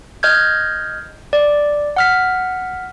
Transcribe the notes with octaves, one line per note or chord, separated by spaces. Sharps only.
D#5 F6 G6 G#6
D5
F#5 F6 B6